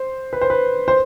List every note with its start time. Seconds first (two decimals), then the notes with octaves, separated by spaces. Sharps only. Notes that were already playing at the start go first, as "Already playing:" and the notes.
Already playing: C5
0.33 B4
0.41 C5
0.50 B4
0.88 C5